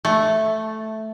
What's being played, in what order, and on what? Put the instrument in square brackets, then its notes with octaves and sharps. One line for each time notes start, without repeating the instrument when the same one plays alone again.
[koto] A3